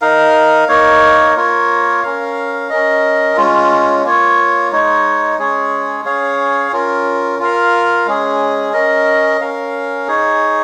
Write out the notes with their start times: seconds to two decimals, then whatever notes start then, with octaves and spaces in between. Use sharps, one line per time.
0.02 D#4 A#4 F5
0.68 A#3 D#4 A#4 C#5
1.36 A#3 F4 A#4 C#5
2.03 C#4 A#4 F5
2.70 C#4 A#4 D#5
3.36 G#3 C#4 F4
4.04 A#3 F4 C#5
4.71 G#3 D#4 C#5
5.38 G#3 C#4 G#4 C#5
6.05 C#4 G#4 C#5 F5
6.72 C#4 F4 A#4
7.40 F4 A#4 F5
8.06 G#3 C#4 G#4
8.73 C#4 A#4 D#5
9.41 C#4 A#4 F5
10.07 D#4 G#4 C#5